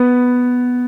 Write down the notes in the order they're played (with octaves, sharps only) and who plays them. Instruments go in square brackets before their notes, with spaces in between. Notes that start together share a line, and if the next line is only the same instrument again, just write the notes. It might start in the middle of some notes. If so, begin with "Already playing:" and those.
Already playing: [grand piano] B3